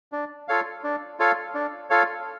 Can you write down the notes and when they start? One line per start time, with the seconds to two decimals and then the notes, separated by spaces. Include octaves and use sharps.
0.12 D4
0.48 F4 A4 C#5 F5
0.83 D4
1.19 F4 A4 C#5 F5
1.54 D4
1.90 F4 A4 C#5 F5